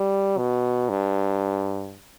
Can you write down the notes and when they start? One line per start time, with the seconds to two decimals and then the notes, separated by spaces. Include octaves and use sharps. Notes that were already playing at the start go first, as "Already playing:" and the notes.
Already playing: G3
0.37 B2
0.89 G2